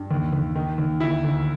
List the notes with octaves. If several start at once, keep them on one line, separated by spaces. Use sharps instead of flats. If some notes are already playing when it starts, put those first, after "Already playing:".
Already playing: G2
D#2
D#2
D#3
D#2
D2 E4
D2